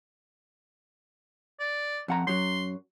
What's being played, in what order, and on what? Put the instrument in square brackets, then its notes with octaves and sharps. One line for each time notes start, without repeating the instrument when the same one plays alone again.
[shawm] D5
[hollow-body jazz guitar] F2 F#5 A#5
[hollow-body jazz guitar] F#2 F#3 [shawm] C6